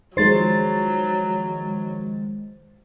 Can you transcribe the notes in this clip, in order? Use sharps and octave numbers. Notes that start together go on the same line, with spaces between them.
D#3 F3 F#3 G#3 C5 A6